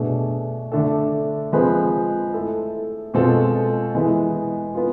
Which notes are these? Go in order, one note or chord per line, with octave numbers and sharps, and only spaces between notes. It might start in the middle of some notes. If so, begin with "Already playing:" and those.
Already playing: B2 A3 D4 G#4
D3 A3 D4 A4
F3 G#3 C4 G#4 B4
A3 E4 A4
B2 G#3 C4 F4 A4
E3 G#3 B3
B3 F4